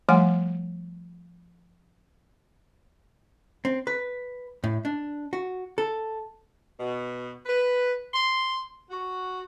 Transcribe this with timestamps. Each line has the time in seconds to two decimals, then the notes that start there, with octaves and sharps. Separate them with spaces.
0.09 F3 G3 A3 F#5 G#5
3.65 C4
3.87 B4
4.64 A2
4.85 D4
5.33 F#4
5.78 A4
6.80 B2
7.46 B4
8.14 C6
8.91 F#4